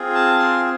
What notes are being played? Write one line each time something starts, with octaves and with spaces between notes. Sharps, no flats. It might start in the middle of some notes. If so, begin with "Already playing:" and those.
Already playing: C4 F4 G#4
A5
C6